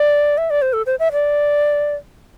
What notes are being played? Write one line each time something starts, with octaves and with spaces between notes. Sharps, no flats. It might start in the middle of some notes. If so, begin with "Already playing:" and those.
Already playing: D5
E5
D5
C5
A4
C5
E5
D5